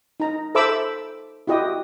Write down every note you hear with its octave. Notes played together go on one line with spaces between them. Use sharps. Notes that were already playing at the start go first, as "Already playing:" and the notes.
D#4 A#5
A4 C5 E5 B5 D6 E6
E4 F#4 G4 D#5